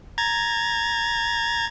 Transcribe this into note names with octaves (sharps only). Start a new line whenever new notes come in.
A#5 G#6 A6